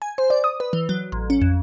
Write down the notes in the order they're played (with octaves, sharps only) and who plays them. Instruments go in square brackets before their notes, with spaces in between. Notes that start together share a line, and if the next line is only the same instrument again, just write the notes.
[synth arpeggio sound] G#5
C5
D5
D#6
B4
E3
F#3
A1
C#4
F2